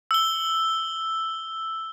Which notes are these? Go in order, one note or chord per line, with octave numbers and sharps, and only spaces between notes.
E6 G7